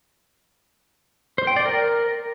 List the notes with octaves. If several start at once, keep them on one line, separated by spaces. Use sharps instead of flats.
C5
G5
D5
A#4